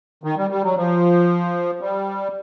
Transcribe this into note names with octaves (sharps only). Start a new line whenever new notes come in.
D#3
G3
G3
F#3
F3
G3